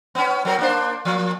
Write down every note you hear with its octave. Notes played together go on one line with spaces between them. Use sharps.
B3 C#4
F#3 C4 A#4
A#3 D4 C5
F3 A#3